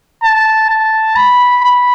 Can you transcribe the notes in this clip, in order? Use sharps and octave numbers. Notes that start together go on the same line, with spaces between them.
A5
A5
B5
B5